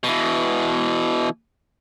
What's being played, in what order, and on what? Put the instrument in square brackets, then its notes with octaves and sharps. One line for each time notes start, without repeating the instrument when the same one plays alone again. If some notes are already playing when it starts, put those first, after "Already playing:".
[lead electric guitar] B2 E3